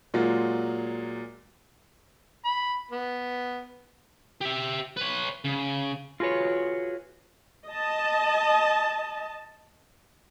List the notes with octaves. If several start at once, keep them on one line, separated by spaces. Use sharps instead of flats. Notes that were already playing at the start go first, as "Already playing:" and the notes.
A#2 F#3 G#3 F4
B5
B3
G4 E5
B4 C#5
C#3
F4 F#4 G#4 B4 C#5
D#5 A5